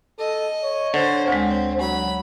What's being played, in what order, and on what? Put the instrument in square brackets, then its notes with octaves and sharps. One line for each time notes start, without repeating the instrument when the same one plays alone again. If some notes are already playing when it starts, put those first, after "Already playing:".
[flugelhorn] A4 [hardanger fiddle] D#5
[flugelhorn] C#5
[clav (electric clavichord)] D3 [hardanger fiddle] C5
[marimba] D2 G#3 [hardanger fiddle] C4
[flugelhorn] F#3 [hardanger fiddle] B5